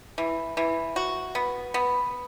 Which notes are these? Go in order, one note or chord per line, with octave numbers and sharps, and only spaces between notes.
E3
E3
F#4
B3
B3